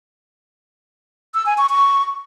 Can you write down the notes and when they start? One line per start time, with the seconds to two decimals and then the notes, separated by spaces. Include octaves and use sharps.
1.34 E6
1.46 G#5
1.58 C#6
1.70 C#6